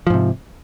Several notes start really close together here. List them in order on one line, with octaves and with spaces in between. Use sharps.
F3 G#2 C3